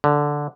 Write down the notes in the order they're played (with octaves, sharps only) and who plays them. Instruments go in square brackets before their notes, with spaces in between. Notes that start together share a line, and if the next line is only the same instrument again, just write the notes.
[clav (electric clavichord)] D3